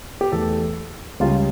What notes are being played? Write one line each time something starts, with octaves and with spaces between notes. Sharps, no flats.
G4
E2 E3 A3 A4
C#2 C#3 G3 F4